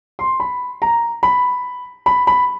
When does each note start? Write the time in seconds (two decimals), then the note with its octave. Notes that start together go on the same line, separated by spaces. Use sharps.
0.19 C6
0.40 B5
0.82 A#5
1.23 B5
2.06 B5
2.27 B5